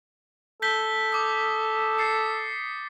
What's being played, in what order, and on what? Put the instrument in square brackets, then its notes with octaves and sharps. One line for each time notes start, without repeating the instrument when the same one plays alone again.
[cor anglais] A4 [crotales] G6 B6 G7
[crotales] D6 D#6
A6 C7 C#7